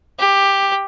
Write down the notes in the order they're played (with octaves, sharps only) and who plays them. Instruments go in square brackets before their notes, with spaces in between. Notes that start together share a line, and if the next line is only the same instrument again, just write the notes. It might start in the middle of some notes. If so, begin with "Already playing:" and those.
[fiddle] G4